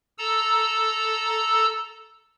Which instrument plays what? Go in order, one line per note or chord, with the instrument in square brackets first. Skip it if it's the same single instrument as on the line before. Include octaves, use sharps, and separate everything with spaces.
[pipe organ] A4 A#5 E6